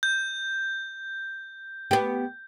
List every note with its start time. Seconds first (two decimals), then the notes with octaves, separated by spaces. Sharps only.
0.03 G6
1.91 B3 G4